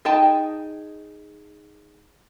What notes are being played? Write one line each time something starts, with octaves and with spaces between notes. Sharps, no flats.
D#4 G#4 D#5 G5 A5